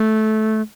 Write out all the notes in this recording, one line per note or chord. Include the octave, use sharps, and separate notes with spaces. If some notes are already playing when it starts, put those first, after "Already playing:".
Already playing: A3